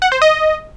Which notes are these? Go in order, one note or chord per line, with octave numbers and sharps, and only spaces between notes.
F#5
C5
D#5